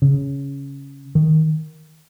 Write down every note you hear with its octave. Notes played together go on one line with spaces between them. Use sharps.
C#3
D#3